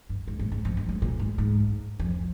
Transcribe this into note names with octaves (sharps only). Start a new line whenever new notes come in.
G2
G#2
G#2
G#2
F2
G2
G#2
A#2
G#2
G#2
F2